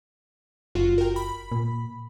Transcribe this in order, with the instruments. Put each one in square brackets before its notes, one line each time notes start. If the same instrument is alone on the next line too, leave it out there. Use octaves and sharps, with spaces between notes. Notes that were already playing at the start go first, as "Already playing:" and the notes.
[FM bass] F#1 [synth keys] F4 F#4
[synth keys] A#4 G5
B5
[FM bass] A#2